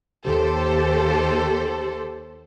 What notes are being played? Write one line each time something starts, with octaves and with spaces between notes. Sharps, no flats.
D#2 G4 A4 C5